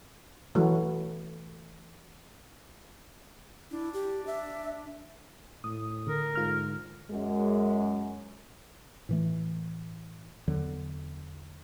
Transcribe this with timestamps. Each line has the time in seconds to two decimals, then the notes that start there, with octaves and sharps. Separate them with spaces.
0.55 E3 F#3 A3
3.71 D4 E4
3.94 G4
4.27 E5
5.64 A2 D#6
6.07 D3 A#4
6.35 G#2 F4 F6
7.09 F#2 G#3
9.09 A2 E3 A3
10.48 E2 D3 F#3